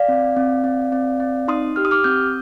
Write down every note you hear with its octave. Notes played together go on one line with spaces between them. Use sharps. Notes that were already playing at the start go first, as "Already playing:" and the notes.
Already playing: D5 F5
C4
C4
C4
C4
C4
D#4 C6 D#6
G4 F6
D#6
D6 F6
C4 D#6 G6